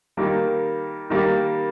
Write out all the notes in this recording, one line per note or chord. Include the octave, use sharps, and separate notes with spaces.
D#3 G3 A#3
D#3 G3 A#3